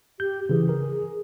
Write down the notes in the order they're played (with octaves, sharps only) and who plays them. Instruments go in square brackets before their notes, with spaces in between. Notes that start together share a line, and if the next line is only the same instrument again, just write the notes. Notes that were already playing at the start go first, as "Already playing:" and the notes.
[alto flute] G4 [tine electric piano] G6
[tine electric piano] C#3 E3 [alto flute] G#4
[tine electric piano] A#4